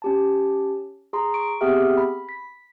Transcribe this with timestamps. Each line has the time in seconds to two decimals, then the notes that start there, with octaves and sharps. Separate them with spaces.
0.02 C#4 G4 A5
1.13 G#4 A#5 C6
1.34 C#6 D7
1.61 B3 C4 G4 G#4 E5 F6
1.97 B5
2.29 B6